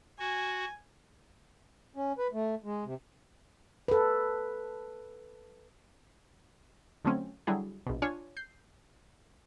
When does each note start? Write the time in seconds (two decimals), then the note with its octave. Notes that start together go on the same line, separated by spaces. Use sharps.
0.19 F#4 G#5
1.96 C#4
2.18 B4
2.33 A3
2.64 G#3
2.85 C3
3.88 A4 B4
7.05 D3 F3 F#3 A3 C4 C#4
7.47 D3 F#3 G3 E4 G#4
7.86 A#1 B2
8.02 D4 F4 C#5 G#5
8.37 G6 C7